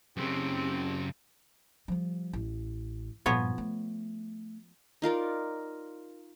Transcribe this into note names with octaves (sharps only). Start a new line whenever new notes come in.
F#2 C#3 C4 G4
F3 G3
A1
G2 A#2 F3 B3 C#5
A3
D#4 F4 A#4 D5